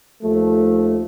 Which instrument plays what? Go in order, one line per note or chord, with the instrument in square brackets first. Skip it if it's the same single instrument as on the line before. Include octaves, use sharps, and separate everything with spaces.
[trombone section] D#2 F3 A3